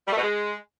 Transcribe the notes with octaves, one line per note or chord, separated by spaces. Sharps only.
G3
A3
B2
G#3